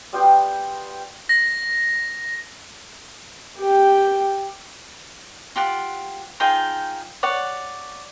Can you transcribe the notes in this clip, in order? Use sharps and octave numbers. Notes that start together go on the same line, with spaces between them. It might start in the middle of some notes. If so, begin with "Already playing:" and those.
G3 B3 F4 G5
A#6
G4 G5
F4 G4 F#5
D#4 F4 G#4 G5
C#5 D5 F#5